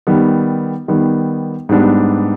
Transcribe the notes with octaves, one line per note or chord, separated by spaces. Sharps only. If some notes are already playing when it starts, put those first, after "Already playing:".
D#3 G3 B3
D#3 G3 B3
G#2 G3 B3 D4